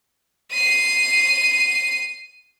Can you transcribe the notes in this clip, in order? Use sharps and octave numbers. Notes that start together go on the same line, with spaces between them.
C7 D#7